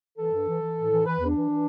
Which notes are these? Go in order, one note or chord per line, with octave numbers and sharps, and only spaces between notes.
E3 A4
G2
E3
E3
A2
E3
E3 B4
E2
D4
E3
E3